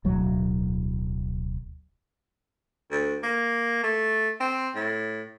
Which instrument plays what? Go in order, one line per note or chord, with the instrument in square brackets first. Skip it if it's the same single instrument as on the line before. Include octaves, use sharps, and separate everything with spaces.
[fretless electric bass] D1 B1 F#3
[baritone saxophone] D2
A#3
A3
C4
A2